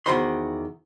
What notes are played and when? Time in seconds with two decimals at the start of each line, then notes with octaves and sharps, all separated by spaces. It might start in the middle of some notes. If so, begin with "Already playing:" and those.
0.06 E2 D#3 F#4 C5 B5 C6